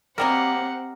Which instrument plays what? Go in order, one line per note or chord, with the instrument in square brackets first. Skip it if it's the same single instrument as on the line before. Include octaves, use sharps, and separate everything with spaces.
[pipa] F#3 G3 A#3 [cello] C4 [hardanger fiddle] G4 F#5 [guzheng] A#4 D#5